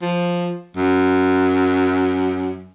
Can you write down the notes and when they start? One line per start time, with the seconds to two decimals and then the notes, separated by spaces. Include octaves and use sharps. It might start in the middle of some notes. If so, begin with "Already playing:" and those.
0.01 F3
0.76 F#2